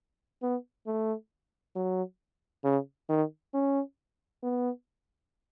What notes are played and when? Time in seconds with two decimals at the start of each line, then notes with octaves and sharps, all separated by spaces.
0.42 B3
0.87 A3
1.76 F#3
2.64 C#3
3.09 D#3
3.54 C#4
4.43 B3